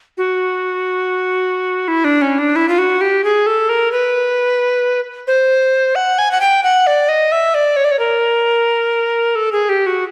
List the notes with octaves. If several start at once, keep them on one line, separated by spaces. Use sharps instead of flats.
F#4
E4
D4
C#4
D4
E4
F4
F#4
G4
G#4
A4
A#4
B4
C5
F#5
G#5
F#5
G5
F#5
D5
D#5
E5
D5
C#5
D5
C#5
A#4
A4
G#4
G4
F#4